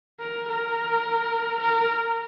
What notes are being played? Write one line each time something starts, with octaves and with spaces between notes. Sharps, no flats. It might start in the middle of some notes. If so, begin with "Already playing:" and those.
A#4
A#4
A#4